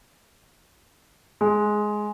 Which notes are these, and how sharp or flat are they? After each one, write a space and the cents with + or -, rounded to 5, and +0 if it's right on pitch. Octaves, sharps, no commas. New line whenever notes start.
G#3 +10